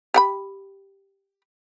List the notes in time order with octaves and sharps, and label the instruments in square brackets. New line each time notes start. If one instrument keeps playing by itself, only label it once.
[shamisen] G4 F#5 B5